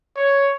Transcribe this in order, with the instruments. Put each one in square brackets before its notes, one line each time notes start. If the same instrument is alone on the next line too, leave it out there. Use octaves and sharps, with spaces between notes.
[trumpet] C#5